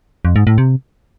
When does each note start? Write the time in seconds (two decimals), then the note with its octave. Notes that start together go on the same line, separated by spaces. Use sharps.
0.25 F2
0.36 G#2
0.47 A2
0.58 C3